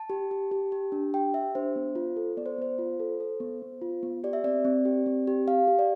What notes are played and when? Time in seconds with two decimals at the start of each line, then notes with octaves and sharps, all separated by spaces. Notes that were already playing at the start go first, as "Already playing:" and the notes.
Already playing: A5
0.10 G4
0.31 G4
0.51 G4
0.72 G4
0.92 D4
1.14 G4 G5
1.34 G4 E5
1.55 D4 C5
1.76 B3
1.95 F4
2.16 A4
2.37 B3 D5
2.46 C5
2.58 B3 C5
2.79 F4
3.00 A4
3.20 A4
3.40 B3
3.62 B3
3.82 F4
4.03 B3
4.24 G4 D5
4.33 E5
4.44 C4 D5
4.65 C4
4.85 G4
5.06 C4
5.27 G4
5.48 G4 F5
5.68 G4
5.79 D5